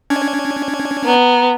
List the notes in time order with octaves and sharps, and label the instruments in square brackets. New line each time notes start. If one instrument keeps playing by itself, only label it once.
[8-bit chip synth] C#4 D4 G#6
[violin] B3 [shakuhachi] A#5